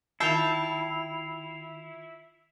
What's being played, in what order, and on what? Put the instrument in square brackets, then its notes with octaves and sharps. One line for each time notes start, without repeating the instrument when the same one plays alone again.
[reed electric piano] D#3 F4 [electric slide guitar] E4 [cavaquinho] E5 G5 A5 [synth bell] C7 F7